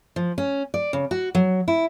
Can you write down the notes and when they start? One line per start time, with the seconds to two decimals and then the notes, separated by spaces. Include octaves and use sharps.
0.16 F3
0.38 C#4
0.74 D5
0.93 C#3
1.11 F#4
1.35 F#3
1.68 E4